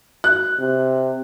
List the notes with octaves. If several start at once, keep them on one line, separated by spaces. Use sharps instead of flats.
F#6
C3